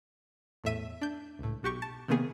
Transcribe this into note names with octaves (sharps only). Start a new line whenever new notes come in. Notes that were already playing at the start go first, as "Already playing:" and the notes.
E2 A2 E5 D#7
D4 G6
C#2 A2
B1 F#4 G4 C#6
A5
C3 D#3 A#3 B3 G#4